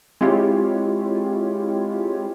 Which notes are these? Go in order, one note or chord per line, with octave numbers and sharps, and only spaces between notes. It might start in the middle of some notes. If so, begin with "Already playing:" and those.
G#3 C4 E4 F4 G4 C#5